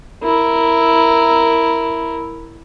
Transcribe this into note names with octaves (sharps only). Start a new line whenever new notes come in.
E4 A#4